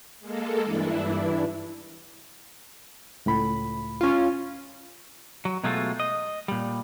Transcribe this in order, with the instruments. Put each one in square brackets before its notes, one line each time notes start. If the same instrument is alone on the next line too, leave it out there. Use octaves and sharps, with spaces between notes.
[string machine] G#3 A#3 A4
G2 E3 D4 E4
[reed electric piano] C#2 A2 B5
[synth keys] C#4 F4
[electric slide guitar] F#3
B2 F#3 G#3 A3 F4
D#5
A#2 G3